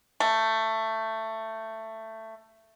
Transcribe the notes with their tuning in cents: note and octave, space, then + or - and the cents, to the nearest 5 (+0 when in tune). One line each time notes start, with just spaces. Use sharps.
A3 +15